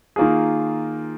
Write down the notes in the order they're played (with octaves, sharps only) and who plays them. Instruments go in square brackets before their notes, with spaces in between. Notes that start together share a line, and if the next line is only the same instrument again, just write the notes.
[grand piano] D#3 A#3 F4 G#4